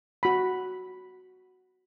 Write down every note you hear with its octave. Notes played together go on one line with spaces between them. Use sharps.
F#4 B5